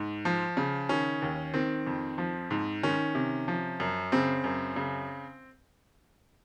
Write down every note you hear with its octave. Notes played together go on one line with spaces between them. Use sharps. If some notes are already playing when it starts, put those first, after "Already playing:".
Already playing: G#2
F3
C#3
D#3 C#4
D#2
D#3 C4
F2
F3
G#2
D#3 C#4
C3
F3
F#2
C#3 C4
F#2
C#3